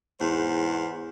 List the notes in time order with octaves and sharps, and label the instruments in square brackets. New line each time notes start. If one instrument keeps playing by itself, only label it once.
[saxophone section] E2 G#2 C5